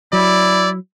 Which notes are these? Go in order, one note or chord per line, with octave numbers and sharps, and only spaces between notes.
F#3 E4 D5